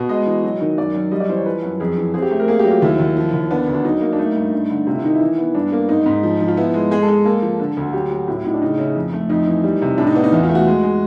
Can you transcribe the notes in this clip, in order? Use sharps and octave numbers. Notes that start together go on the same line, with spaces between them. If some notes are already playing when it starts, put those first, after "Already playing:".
Already playing: B2
G#3 D#5
E3
F#3
D#3
F#2 D5
F#2
G3 D#5
D5
E3 C5
C#5
F3 B4
F#2
F2 G#4
E3
C4 G#4
G4
A3
A#4
A#3 G#4
G4
F#3
F4
D#2 E4
D#2
F3
D#2
B3 D4
D2
D4
F#3 D#4
A#3
D4
A3 D#4
G2
G2
D3
C3 F4
E4
D#3 D#4
E4
E3
B3
G2 D4
A#3
G#2 D#4
G#2
F3
F3
F4
B3 E4
G#3
G#3 G#4
A4
G#3
A#3 A4
F3
D3
D2
F#3 G4
F#3
A2 F#4
E4
A2 D#4
D4
C#3 D#4
C#3 E4
F2
A3
F2 D#4
E3
G3
C3
A2 D4
D#4
B3 D4
D#4
E2 E4
F4
A3
F#4
G#3
G#3